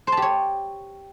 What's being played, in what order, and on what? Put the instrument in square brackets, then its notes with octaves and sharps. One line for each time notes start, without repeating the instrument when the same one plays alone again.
[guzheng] C5
A5
G4
C#5